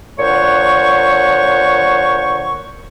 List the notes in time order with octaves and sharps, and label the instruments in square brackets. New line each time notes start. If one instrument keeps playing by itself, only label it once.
[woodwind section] A#2 D3 C5 C#5 F#5 C#6